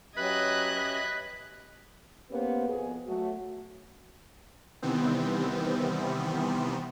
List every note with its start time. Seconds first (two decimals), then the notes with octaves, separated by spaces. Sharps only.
0.17 F#3 C#4 G4 B4 D#5 E5 F#6 G#6
0.77 B4
2.31 A#3 B3 C#4 G4 B4 C5
2.68 F2 B2 G#4
3.06 F#3 A3 F#4
4.82 C3 D#3 E3 G3 B3 C4